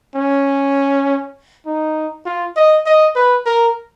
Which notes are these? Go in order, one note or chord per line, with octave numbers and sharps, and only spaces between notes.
C#4
D#4
F4
D#5
D#5
B4
A#4